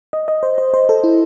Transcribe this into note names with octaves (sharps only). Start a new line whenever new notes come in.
D#5
D#5
C5
C5
C5
A4
E4